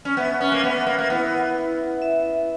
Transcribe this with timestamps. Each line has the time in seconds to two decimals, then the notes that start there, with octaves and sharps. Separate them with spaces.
0.05 C#4
0.17 B3 E5
0.41 C#4
0.52 A#3
0.63 B3 E5
0.87 A#3
0.98 A#3
1.10 B3 E4
1.56 E4
2.02 E5